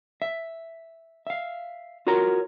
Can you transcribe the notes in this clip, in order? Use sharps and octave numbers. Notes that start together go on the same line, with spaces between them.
E5
E5 F5
F4 F#4 A#4 C#5 A#5